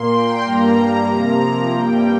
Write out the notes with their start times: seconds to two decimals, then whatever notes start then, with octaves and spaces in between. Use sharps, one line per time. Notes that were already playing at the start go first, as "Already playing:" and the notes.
Already playing: A#2 A#3 C6
0.11 G5
0.43 G2 G3 A#3 A#5
1.07 C3 F3 A#3 A#5
1.71 G2 G3 A#3 G5